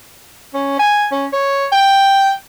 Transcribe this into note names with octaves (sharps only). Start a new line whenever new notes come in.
C#4
G#5
C#4
C#5
G5